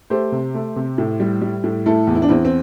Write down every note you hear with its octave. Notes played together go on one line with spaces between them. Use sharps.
A3 G4 C5
C3
A3
C3
A2
G3
G3
A2
A3 E4 A4
E2
E4
D4
E2 C4 E4
C4